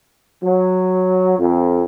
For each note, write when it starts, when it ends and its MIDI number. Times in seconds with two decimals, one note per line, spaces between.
0.42 1.37 54
1.39 1.83 41